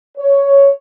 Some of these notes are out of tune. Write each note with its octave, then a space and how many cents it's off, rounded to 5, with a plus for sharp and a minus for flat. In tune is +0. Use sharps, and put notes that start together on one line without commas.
C#5 +5